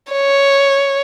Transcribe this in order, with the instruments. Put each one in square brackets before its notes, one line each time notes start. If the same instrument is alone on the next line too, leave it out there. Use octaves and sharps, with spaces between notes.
[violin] C#5